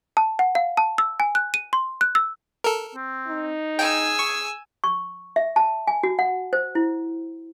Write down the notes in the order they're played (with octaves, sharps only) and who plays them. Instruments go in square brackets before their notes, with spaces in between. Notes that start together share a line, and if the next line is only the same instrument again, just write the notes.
[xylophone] A5
F#5
F5
A5
E6
G#5
F#6
D#7
C6
F#6
E6
[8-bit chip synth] A4 A#4
[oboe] C4
[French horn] D#4
[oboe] G#4 [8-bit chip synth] G5 [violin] G#5 E6
[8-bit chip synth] C#6
[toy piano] C#6
E5
A5
G#5
F#4
F#5
C5
E4